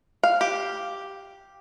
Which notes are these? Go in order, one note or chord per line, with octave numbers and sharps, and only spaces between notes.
F5
G4